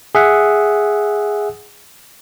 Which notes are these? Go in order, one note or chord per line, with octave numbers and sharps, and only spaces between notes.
G#4 E5 F#5